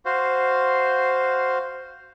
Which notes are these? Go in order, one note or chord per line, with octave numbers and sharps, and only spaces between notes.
F#4 C5 F5